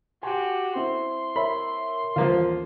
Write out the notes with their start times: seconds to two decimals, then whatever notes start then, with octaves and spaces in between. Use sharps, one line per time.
0.23 F#4 G4 G#5 C6
0.75 C4 E4 C6
1.36 A#4 C#5 E5 B5
2.16 A1 D#2 F3 A#3 F4